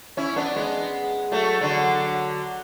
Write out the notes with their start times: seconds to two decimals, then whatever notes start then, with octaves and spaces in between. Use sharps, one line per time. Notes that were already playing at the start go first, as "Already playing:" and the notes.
0.17 C#4 E4
0.36 B3 D4
0.56 G#3 B3
1.32 F#3 A3
1.61 D3 F#3